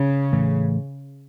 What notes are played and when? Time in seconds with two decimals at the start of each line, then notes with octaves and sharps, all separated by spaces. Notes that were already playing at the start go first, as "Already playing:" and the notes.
Already playing: C#3
0.32 A2 E3 A3